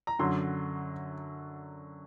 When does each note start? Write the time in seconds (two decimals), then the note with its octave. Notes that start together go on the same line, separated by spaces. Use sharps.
0.07 A#5
0.19 F#2 D3 F#3 C6